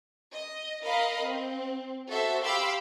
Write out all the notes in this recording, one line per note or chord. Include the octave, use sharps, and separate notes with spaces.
D#5
A#4 D#5 F5 B5
C4
F#4 A4 C5 E5
G4 F5 B5 C6 D6 E6